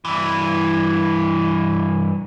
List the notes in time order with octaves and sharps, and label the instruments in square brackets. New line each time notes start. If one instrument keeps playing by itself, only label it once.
[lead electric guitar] G2 E3